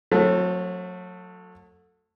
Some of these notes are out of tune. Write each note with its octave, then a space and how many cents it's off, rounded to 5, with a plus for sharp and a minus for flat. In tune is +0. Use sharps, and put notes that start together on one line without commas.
F#3 -30 A3 +15 C4 +0